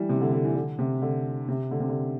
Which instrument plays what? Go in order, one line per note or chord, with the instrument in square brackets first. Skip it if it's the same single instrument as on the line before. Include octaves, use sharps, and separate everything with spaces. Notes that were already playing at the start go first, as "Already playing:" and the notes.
Already playing: [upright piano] E3 G3
C3
E3
D3
D3
E3
D3
C3
D3
C3
D3
C3
D3